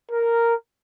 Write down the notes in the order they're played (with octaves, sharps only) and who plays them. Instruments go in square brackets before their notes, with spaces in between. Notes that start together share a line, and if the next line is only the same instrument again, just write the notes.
[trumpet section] A#4